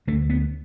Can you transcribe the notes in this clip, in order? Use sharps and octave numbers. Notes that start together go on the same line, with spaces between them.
D2 A3
B3